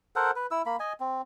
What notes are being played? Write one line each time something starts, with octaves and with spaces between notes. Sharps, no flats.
A4 A#4 C5 F#5
B4
E4 E6
A#3 B5
D#5 G#5
C4